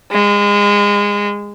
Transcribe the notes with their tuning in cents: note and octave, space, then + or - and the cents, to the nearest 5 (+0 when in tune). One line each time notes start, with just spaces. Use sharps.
G#3 -25